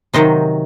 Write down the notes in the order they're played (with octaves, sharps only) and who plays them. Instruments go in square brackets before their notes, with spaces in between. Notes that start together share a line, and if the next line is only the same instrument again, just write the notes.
[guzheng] C3 D#3 F#3 C5 D#5